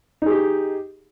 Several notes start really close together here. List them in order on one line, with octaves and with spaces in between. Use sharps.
D#4 G#4 G4